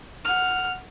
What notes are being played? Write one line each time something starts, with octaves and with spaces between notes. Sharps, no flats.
F#5 F6